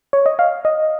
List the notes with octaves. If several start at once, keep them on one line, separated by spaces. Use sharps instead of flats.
C#5
D#5
F5
D#5